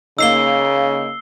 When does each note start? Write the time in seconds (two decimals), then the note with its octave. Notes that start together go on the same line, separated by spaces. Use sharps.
0.19 C#3 A#3 D#4 E6 C7 G7